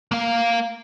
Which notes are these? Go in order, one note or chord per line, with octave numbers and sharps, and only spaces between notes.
A#3 F5